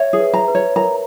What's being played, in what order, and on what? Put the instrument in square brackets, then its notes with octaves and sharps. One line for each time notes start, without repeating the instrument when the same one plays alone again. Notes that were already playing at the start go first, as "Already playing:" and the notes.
Already playing: [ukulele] C#5 [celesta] E5
[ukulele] G#4
[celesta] B4
[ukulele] A#5
[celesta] B4
[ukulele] C#5
[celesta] A#4 [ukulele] A#5